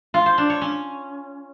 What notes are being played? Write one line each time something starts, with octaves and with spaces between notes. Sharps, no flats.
F4
C5
D4
C#5
C#4